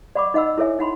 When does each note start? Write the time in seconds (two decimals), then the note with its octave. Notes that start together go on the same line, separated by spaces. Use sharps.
0.15 D5 F#5 B5 C#6 D6
0.34 D#4 D#5 F#5 B5 E6
0.58 E4 A4 C#5 E5 G#5
0.79 D#4 F#5 B5 C6